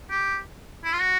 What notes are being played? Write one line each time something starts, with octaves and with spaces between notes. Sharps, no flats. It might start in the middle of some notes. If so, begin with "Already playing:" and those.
G4
E4
F4
F#4